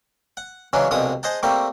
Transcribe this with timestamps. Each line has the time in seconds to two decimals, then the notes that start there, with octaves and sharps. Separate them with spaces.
0.37 F#5
0.73 C#3 E3 F#3 G#3 C#4 D4
0.91 C2 B2 D3 F3 G#3 D#6
1.23 G#4 C5 D#5 F#5 A5
1.43 G3 A3 A#3 C4 C#6